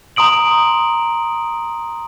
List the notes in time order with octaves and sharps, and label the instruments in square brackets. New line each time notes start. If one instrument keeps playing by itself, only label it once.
[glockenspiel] A#5 C6 D#6 D7 F#7